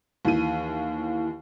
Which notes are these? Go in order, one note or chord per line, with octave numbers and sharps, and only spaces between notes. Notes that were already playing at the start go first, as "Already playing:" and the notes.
D#2 E3 D#7